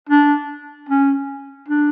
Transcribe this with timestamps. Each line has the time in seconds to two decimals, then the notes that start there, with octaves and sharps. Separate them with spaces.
0.09 D4
0.89 C#4
1.69 D4